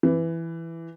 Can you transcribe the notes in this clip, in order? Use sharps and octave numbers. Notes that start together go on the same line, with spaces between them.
E3